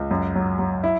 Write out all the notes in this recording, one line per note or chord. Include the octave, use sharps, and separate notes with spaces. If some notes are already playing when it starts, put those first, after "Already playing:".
Already playing: C#2
F#2
F#3
F#3
E4